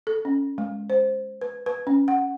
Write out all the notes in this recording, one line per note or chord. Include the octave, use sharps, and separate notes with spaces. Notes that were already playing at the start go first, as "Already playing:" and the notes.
A4
C#4
G#3
C5
B4
B4
C#4
F#5